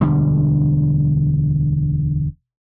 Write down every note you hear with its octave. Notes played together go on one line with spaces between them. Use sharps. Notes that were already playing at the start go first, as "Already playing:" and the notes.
E1 D2 D3 G3